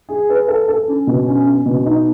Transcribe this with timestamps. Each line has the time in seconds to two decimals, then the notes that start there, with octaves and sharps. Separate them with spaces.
0.09 G#4
0.29 B4
0.48 A4
0.68 A4
0.88 C#4
1.07 B2
1.27 C#4
1.46 C#4
1.66 B2
1.86 D#4